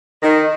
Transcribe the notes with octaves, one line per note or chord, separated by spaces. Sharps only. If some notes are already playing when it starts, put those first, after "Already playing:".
D#3